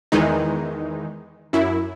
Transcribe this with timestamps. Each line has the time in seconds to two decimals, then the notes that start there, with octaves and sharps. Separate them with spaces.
0.12 E2 D#3 E3 G#3 D#4
1.53 F#2 E4